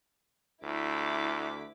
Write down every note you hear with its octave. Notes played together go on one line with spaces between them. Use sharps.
D2 E4 D6 B6